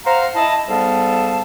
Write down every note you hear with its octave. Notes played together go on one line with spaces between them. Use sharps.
C5 F5 F#5 A#5
E4 D#5 A5
G#2 G3 B3 A4 F5 A5